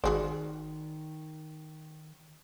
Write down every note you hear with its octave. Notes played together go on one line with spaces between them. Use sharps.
G#1 D#3 F#4 G#4 C5 D5